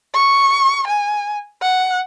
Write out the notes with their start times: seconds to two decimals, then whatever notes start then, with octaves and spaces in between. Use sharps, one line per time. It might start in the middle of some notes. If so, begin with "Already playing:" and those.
0.14 C#6
0.87 G#5
1.62 F#5